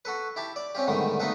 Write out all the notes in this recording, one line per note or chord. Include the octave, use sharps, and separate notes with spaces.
F#4 A4 B4
E4 G4 A5
D5
C4 C#4 F4 G4
G#2 B2 D3 D#3 G3 A3
A3 B3 D#4 F4 A4 B4